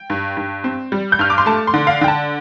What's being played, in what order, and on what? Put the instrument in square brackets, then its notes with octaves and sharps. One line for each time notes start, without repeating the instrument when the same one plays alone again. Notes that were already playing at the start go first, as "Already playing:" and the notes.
Already playing: [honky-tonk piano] G5
G2
G2
C4
G3
G6
G2 F6
D6
C6
A3 A5
C6
D3
F5
D3 G5
A5